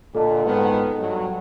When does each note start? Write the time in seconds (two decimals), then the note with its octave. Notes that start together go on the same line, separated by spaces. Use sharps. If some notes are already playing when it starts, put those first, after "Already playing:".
0.15 A#2 D3 A4 D#5 A5
0.46 G#2 D#3 B3
0.99 G2 F#3